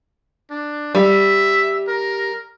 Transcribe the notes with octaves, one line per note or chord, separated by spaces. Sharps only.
D4
G3 E5
A#4